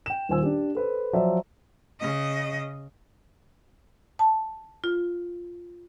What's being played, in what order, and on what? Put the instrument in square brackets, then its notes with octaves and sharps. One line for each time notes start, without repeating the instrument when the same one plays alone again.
[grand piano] G5 E7
D#1 F4 C5 G#5 E6
D4 G4
A4 B4 C5
F3 F#3 D5 E5
[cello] C#3 D#5
[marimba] A5
F4